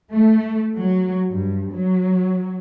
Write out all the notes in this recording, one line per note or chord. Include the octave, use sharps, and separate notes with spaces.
A3
F#3
G2
F#3